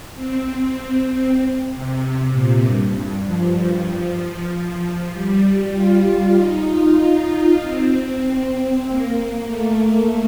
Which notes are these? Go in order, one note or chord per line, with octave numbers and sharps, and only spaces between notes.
C4
C3
A#2
G2
F3
F3
F3
G3
F4
D#4
F4
D#4
C4
A#3
A3